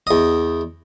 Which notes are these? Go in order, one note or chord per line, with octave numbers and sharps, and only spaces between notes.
E2 D#5